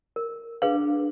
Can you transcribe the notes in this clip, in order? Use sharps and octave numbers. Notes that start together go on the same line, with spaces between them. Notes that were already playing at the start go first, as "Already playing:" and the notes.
A#4
D4 G#4 B4 F5